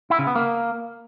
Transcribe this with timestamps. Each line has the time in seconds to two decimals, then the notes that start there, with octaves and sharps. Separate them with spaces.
0.10 E4
0.19 C#3
0.27 B3
0.36 A#3